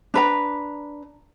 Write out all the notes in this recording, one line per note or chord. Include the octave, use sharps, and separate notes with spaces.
D4 B4 A#5